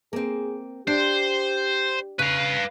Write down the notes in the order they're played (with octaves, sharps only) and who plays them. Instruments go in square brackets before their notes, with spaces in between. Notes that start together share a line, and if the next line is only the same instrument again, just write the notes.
[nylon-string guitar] A#3 C4 [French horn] G#4
[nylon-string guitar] D4 [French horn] G4 [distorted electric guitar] C5
[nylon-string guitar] C#3 [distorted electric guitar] B4 F5